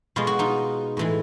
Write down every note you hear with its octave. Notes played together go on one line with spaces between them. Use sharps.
B2 G#3 F4
F#4
D#4 F4
A2 E3 G#3